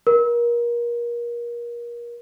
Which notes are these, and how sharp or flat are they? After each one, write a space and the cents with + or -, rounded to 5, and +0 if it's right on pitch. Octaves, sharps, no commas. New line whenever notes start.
A#4 +30